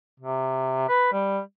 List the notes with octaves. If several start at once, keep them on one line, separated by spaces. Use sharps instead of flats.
C3
B4
G3